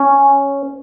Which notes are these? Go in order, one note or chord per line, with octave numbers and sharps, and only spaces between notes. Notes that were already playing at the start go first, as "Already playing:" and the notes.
Already playing: C#4